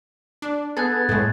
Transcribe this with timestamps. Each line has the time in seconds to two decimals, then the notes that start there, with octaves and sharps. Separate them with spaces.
0.42 D4
0.77 B3 G#4 A4 F#6 G#6 A6
1.09 A2 G#3